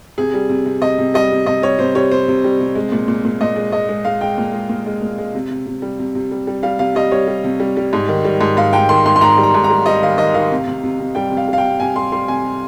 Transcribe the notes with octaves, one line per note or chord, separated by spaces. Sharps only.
C3 G#4
G3
C3
C3
C3 D#5
C3
G3 D#5
C3
C3 D#5
G3 C#5
C3 C5
G3 C#5
C3 C5
C3
G3
C3
G#3
A#2
A#2
A#2
A#2 D#5
G#3
G#3 D#5
G#3
G#3 F5
G#3 G5
A#2
G#3
A#2
G#3
A#2
G#3
C3
C3
C3
G3
C3
C3
G3
G3
G3 F5
C3 F5
G3 D#5
G3 C#5
G3
C3
G3
G3
G#2
D#3
G3
G#2
G#2 F5
G#2 G5
D#3 C6
G#2 C6
C6
G#2 A#5
G3
A#5
G#2
A#5
G3
G3 D#5
D#3 F5
D#3 D#5
D#3 F5
C3
C3
C3
C3
G3 G5
C3
F5
G3 F5
G5
C3
C3 G#5
G3 C6
G3 C6
C3 G#5
C3